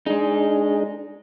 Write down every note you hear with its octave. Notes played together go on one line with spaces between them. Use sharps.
G#3 D4 D#4 G#4